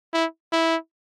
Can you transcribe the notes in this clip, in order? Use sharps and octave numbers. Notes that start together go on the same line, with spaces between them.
E4
E4